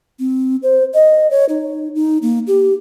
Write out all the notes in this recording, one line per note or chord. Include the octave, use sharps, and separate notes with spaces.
C4
C5
D#5
C#5
D#4
D#4
A#3
G4